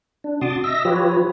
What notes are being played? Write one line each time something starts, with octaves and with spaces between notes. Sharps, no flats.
D4
C3 F#4 A5 C6 D6 D#6
D#5 E5 E6 A#6
F3 F4 G4 B4 C#5